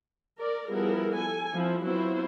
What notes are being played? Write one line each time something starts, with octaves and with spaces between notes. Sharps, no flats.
A#4 D5
F3 G3 B3 E4 G#4 A#4
A4 G#5
F3 C4 E4
F#3 B3 C4 E4 F4 C5